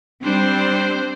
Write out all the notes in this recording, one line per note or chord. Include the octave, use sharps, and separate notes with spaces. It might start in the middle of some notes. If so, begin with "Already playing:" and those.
G3 C4 D4 C5